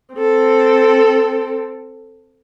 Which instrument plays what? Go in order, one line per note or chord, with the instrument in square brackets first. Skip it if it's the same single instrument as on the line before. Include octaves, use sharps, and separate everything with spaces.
[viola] C4 A4